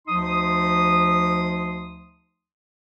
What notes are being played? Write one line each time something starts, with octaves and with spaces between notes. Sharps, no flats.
D2 F3 D#4 C6 D#6